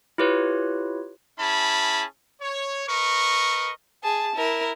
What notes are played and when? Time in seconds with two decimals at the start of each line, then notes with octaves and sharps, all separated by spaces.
0.18 E4 F4 G4 B4 C#5
1.39 C#4 E4 G#4 A5 B5
2.41 C#5
2.88 A#4 B4 D#5 C#6
4.03 G#4 A5
4.36 E4 A#4